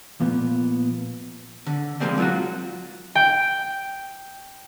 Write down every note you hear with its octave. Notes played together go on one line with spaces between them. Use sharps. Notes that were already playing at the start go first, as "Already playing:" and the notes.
A#2 F3 B3
D3
C3 F3 G#3 A#3 C4 D4
F#3 F4 F#4
G5